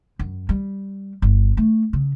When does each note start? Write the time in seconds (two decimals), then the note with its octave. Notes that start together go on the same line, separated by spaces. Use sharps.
0.19 F#2
0.49 G3
1.22 G1
1.57 A3
1.93 C#3